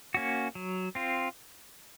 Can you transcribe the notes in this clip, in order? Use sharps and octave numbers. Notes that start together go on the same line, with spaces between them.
A#3 C#4 F#4
F#3
C4 F4